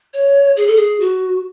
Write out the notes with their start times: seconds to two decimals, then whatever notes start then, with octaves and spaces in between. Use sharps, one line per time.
0.13 C#5
0.57 G#4
0.67 A4
0.77 G#4
1.00 F#4